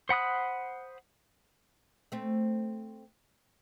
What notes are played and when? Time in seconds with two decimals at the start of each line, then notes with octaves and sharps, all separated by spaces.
0.09 C5 F#5 B5 D#6 F#6
2.12 A3 C4